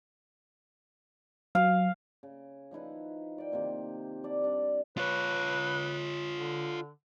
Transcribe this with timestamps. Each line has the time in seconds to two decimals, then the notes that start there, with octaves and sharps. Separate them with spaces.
1.55 F#3 F5
2.23 C#3
2.71 F3 D#4 E4 B4
3.38 D5 G5
3.52 C3 D#3 A#3 C4
4.24 E4 D5 A5
4.42 G3 D4
4.98 F4 B4 C#5
6.36 D3